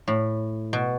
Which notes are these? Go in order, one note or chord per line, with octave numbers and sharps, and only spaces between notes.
A2
B2